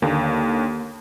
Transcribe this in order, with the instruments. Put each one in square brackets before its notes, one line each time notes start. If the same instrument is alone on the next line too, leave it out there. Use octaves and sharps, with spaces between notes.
[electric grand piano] D#2 D3 [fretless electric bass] A#3